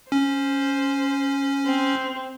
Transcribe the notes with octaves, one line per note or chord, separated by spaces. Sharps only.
C#4 C5
C4